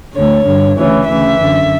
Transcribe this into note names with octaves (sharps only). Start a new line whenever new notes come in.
D2 D3 C#5
G2 D3
D2 C#3 E3 C#5
D2 C#3 E3 E5
F#2 D3